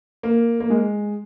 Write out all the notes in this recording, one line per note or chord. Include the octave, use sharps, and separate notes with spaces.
A#3
A#3
G#3